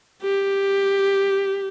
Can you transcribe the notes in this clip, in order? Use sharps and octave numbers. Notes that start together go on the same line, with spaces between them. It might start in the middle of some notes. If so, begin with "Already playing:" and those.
G4